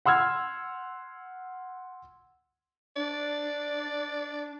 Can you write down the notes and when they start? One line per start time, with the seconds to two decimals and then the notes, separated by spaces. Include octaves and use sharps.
0.06 F#5 C6 E6 F6 G#6
2.96 D4 D5